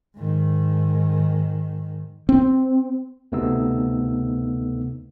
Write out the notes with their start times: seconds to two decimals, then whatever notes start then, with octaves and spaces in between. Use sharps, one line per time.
0.17 G#2 D#3
2.29 C4
3.32 D2 C3 A3 B3 D#4 E6